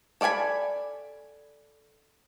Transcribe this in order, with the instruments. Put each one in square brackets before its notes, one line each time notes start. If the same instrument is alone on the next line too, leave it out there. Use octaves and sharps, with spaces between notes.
[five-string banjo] A4 D5 E5 G#5 B5